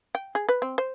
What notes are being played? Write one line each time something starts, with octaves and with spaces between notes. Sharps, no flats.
G5
G#4
B4
C4
C5